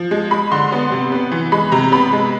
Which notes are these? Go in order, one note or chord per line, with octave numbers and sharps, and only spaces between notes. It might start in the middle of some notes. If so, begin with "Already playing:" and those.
Already playing: F3
G#3
G#3 B5
D3 C6
B3
C3
B3
E3
G#3 B5
C3 A#5
B3 B5
G#3